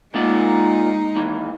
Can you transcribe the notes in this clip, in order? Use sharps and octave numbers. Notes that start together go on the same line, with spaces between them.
G#3 A#3 D#4 F4 F#5
D#2 E3